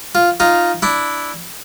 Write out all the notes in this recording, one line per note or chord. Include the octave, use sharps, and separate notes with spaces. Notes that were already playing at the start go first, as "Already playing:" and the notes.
F4
D#4 F4
D4 E4